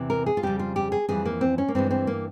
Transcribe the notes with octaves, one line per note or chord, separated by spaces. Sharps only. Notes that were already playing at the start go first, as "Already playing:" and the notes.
Already playing: E2 C3 E3
A#4
G#4
F4
F2 C#3 G3 G4
F4
G4
G#4
F2 E3 G3 G#4
A#3
C4
C#4
A#3
G2 E3 G#3 C4
C4
A#3